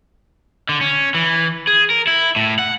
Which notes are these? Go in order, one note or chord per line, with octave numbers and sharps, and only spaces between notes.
D3
C#4
E3
G#4
A#4
E4
A2
F#5